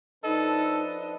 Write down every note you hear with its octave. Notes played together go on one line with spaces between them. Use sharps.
F3 D4 D#4 A4 B4 D#5